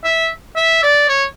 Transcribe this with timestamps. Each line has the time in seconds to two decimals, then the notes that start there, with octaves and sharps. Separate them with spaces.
0.04 E5
0.56 E5
0.83 D5
1.09 C#5